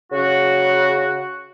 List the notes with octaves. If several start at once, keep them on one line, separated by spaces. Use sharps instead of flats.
C#3 F#4